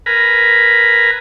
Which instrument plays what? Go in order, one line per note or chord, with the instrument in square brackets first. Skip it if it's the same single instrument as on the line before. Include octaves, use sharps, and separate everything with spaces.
[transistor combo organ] A#4 B4 G#5 A#5 B5